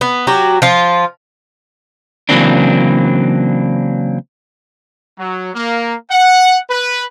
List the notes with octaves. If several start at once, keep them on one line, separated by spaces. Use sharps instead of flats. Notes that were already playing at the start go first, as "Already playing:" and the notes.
B3
F#3 F#4 G4
F3 F4
C#3 E3 F#3 A#3 C4 D4
F#3
A#3
F#5
B4